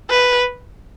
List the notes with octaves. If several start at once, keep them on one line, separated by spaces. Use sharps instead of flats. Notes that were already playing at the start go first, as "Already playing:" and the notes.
B4